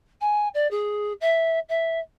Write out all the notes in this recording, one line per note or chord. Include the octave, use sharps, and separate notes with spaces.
G#5
D5
G#4
E5
E5